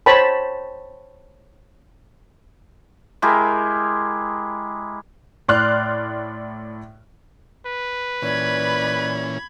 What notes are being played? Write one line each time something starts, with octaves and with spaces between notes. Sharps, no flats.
C5 C#5 G5 A5 B5
G#3 E4 G4 A#4
A2 D5 C6 F6 F#6
B4
A#2 E3 C#4 D5 B5 G#6